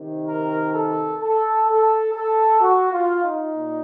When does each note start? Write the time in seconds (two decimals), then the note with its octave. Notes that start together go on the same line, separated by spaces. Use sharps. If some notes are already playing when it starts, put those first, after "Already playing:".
Already playing: C3 D#3
0.26 A#4
0.74 A4
1.20 A4
1.67 A4
2.14 A4
2.60 F#4
2.92 F4
3.22 D#4
3.53 A#2